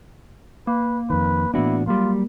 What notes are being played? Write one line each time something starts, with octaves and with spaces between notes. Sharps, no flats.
A#3 B4
F2 D#3 B4
A2 E3 B3 D4 E4 F#4
F#3 G3 A#3 F4